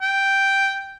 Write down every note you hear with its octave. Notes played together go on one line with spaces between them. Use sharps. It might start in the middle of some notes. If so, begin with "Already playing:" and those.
G5